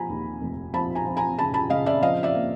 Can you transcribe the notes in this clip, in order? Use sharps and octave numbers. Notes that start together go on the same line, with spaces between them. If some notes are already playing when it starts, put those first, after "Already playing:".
Already playing: F3 G#5 A#5 B5
D#2
F1
F3 A5 B5
G#5 A#5
F3
G#5 A#5
C#3 A5 B5
A5 B5
C#3 D#5 F5
D5 E5
F3 D#5 F5
D5 E5
A#3